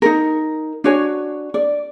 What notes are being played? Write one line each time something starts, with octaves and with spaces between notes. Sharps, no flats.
D#4 A#4
D4 F#4 C#5 G#5
D5